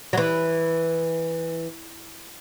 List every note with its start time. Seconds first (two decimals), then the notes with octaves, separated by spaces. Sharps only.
0.13 F#3
0.17 E3